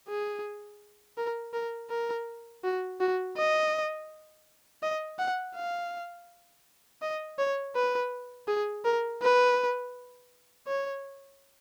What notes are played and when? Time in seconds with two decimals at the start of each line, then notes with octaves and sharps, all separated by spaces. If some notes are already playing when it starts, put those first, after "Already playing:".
0.08 G#4
1.17 A#4
1.53 A#4
1.90 A#4
2.64 F#4
3.00 F#4
3.37 D#5
4.83 D#5
5.19 F#5
5.55 F5
7.02 D#5
7.39 C#5
7.76 B4
8.48 G#4
8.84 A#4
9.22 B4
10.67 C#5